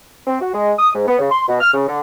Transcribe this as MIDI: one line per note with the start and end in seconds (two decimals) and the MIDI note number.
0.27 0.39 60
0.41 0.51 66
0.54 0.72 56
0.79 0.94 87
0.95 1.06 44
1.07 1.17 59
1.19 1.28 49
1.31 1.43 84
1.47 1.60 47
1.60 1.72 89
1.74 1.86 49
1.88 2.00 50